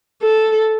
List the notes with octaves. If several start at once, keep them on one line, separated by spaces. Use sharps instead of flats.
A4